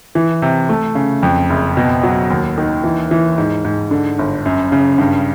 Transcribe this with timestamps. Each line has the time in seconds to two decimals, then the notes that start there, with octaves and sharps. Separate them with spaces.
0.15 E3
0.42 C3
0.69 A3
0.95 C#3
1.23 F2
1.50 F#1
1.77 B2
2.03 F#3
2.30 D#2
2.58 D#3
2.84 E3
3.11 E3
3.38 G#2
3.65 G#2
3.91 D3
4.19 G1
4.46 F#2
4.72 C#3
4.98 G2